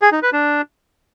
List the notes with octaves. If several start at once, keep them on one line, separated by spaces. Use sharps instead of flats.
G#4
D#4
B4
D4